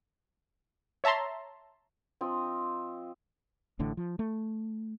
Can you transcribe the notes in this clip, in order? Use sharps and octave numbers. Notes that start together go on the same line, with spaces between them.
C#5 E5 A5 A#5 C6
F3 C4 D#5
A1 A2 D3
F3
A3